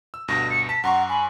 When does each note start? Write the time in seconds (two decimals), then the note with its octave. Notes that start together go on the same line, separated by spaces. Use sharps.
0.14 E6
0.28 D2 G2 B2 A#6
0.50 C#7
0.69 A5 B6
0.84 F#2 F#5 A#5 C6 C#6
1.09 G#5 B5